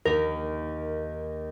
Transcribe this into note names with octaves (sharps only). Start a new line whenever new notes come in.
D#2 A#4